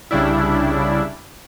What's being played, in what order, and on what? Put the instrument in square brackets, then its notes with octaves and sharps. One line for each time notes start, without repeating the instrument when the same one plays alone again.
[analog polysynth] C2 C#3 G3 D4 E4